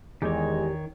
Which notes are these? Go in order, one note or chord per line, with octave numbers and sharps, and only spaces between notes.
E2 D#3 G#3 G4 C#5